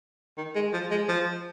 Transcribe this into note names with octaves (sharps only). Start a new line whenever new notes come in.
D#3
G#3
F3
G#3
F3